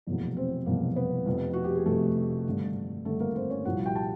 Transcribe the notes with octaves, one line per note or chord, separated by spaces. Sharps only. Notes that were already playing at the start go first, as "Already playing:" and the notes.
F1 E2 B2 F#3 A#3
C4 C5
F1 E2 B2 F#3 A#3
B3 B4
F1 F2 C3
F#4
G4
G#4
F1 F2 C3 A3 A4
G#1 G2 D3
G#1 G2 D3 A3 A4
A#3 A#4
C4 C5
C#4 C#5
C2 A#2 F3 F#4 F#5
G4 G5
A5